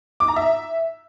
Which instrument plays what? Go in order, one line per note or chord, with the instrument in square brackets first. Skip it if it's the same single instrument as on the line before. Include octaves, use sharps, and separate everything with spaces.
[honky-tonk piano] D6
A#5
E5